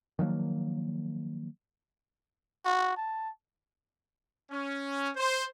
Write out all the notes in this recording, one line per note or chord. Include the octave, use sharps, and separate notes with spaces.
D#3 F3 F#3 A#3
F#4
A5
C#4
C5